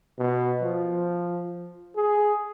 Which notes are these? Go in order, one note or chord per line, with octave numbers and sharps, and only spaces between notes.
B2
F3
G#4